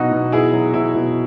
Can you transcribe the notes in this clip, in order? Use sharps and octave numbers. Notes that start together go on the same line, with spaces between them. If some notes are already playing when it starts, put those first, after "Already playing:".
Already playing: B2 F#3 B3 D#4 E4 F#4
B2
B3 E4 G#4
F#3
B2 E4
B2